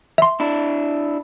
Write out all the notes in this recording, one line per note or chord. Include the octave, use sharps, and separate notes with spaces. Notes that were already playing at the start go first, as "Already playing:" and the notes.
E5 C6
D4 E4